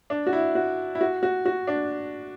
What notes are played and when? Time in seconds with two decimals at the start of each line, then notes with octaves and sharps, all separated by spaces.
0.10 D4
0.27 F#4
0.33 E4
0.55 F#4
0.95 E4
1.01 F#4
1.23 F#4
1.46 F#4
1.67 D4